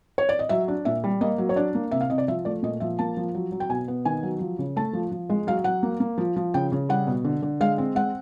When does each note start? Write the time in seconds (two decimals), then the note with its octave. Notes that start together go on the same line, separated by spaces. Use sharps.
0.18 C#5
0.29 D5
0.39 D#5
0.49 F#3 E5
0.68 D4
0.85 A#2 E5
1.04 G3
1.21 A#3 D#5
1.38 F#3
1.49 C#5
1.56 D4 D5
1.75 A#3
1.91 C3 E5
2.01 F5
2.10 C3 D#5
2.18 D5
2.28 F3 E5
2.45 A3 D5
2.62 A#2 D#5
2.80 F3 E5
2.99 A#3 A5
3.17 F3
3.35 F#3
3.52 F#3
3.60 G5
3.69 B2 G#5
3.88 B3
4.05 D#3 G#5
4.23 F#3
4.40 F3
4.59 C#3
4.76 A3 A5
4.93 F3
5.11 F3
5.30 G#3
5.47 F#3 F5
5.64 F#3 F#5
5.83 A#3
6.00 A#3
6.18 F3
6.36 F3
6.54 C#3 G5
6.72 C#3
6.89 G3 F#5
7.07 B2
7.24 D3
7.42 D3
7.61 G#3 F5
7.78 C4
7.95 G#3 F#5